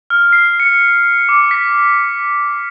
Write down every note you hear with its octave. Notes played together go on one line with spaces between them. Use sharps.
F6
C7
C#7
D6
B6